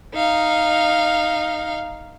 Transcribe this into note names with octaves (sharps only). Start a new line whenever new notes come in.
D#4 F5